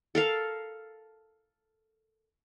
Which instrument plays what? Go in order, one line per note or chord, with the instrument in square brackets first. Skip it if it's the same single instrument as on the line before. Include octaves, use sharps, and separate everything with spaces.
[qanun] A4 A#4 F5